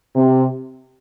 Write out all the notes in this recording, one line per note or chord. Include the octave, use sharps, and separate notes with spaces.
C3